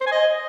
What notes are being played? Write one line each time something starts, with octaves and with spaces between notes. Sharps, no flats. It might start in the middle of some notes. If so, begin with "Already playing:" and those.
C5
G#5
D#5